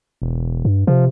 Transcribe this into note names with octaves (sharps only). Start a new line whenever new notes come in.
E1
G2
C3 F3